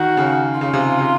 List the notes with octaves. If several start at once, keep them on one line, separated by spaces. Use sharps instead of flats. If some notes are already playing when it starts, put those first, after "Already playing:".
Already playing: D#3 F#4
C#3
C#3 F4
C3
C3